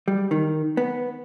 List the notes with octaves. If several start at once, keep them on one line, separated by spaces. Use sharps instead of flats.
G3
D#3
B3